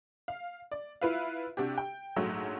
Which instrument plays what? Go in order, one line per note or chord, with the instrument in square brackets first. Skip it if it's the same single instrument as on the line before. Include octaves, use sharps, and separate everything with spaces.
[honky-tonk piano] F5
D5
E4 F4 B4 E5 F5
C3 D4 F#4 G4
G5
A#1 G#2 F#3 A3